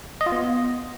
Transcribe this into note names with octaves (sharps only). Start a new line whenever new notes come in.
D#5
F4
B3